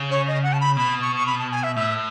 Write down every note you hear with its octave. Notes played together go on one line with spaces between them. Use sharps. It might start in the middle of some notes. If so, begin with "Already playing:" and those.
Already playing: C#3
C#5
D#5
F#5
A5
B5
B2 B5
C#6
C#6
B5
A5
G#5
E5
A2 E5